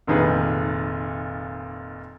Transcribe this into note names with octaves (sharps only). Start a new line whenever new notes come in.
F1 A#2 D#3 G#4 B4